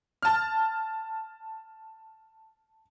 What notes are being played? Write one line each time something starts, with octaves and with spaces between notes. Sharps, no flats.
A5 F6